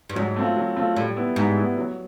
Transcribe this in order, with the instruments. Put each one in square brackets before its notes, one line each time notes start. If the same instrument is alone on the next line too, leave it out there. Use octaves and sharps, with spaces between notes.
[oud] G2
[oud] G#2 [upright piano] F#3
[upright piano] A3 C4 F4
F#3
A3 C4 F4
[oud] A2 [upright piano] G3
[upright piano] B3 E4
[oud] G#2 [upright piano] G3
[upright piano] B3 E4
F#3